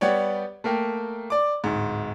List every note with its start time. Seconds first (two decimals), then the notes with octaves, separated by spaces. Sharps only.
0.01 G3 B3 G4 C#5 D5
0.64 A3 A#3 A#4 G5
1.30 D5 D6
1.64 D1 G#2